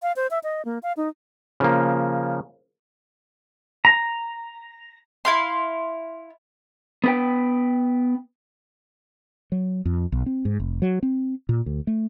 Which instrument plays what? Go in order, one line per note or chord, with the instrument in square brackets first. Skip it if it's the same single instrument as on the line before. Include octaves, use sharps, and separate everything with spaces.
[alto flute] F5
C5
E5
D#5
A#3
F5
D#4
[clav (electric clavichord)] C#3 F3 A#3
[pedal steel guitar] A#5
[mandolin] E4 F5 C6
[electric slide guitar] B3 B4 G5
[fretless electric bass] F#3
F2
B1
C4
G#2
F1
F#3
C4
A#2
D2
A3